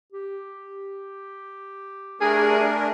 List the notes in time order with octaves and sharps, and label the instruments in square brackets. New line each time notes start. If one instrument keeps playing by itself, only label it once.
[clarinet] G4
[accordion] A3 D4 A#4 [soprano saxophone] G#4